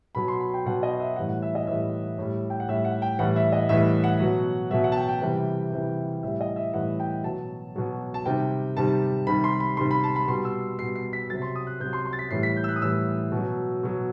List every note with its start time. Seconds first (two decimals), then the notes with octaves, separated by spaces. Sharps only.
0.15 B2 F#3 B5
0.28 C6
0.41 B5
0.54 G5
0.66 B2 F#3 F#5
0.83 D#5
1.00 E5
1.16 A2 E3 G3 F#5
1.29 F#5
1.42 E5
1.55 D#5
1.67 A2 E3 G3 E5
2.18 A2 G3
2.50 G5
2.60 F#5
2.68 A2 G3 E5
2.85 F#5
3.02 G5
3.19 A2 E3 G3 F#5
3.36 E5
3.52 D#5
3.69 A2 E3 G3 E5
4.04 F#5
4.20 B2 F#3
4.71 B2 F#3 E5
4.84 F#5
4.92 A5
4.97 G5
5.08 G5
5.22 C3 E3 G3
5.72 C3 E3 G3
6.23 A2 E3 G3 E5
6.41 D#5
6.56 E5
6.73 A2 E3 G3 F#5
7.00 G5
7.24 B2 F#3 A5
7.76 B2 F#3
8.14 A5
8.25 C3 D#3 G3 G5
8.77 C3 D#3 G3 A5
9.27 C3 D#3 G3 B5
9.44 C6
9.60 B5
9.77 C3 D#3 G3 C6
9.91 B5
10.04 A5
10.16 B5
10.28 B2 G3 C6
10.45 E6
10.78 B2 G3 C7
10.96 C7
11.13 B6
11.30 C3 F#3 A6
11.42 C6
11.56 D#6
11.67 F#6
11.80 C3 F#3 G6
11.93 C6
12.05 C6
12.13 A6
12.19 B6
12.31 A2 E3 G3 C7
12.43 B6
12.57 G6
12.64 E6
12.69 F#6
12.76 D#6
12.82 A2 E3 G3 E6
13.32 B2
13.37 F#3
13.83 B2 F#3